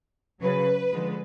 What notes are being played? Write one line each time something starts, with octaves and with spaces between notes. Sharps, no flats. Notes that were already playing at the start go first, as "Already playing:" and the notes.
C#3 F#3 B4
D3 F3 G#3